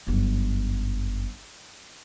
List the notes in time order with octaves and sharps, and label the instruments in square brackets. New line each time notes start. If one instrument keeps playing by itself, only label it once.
[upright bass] G1 F#2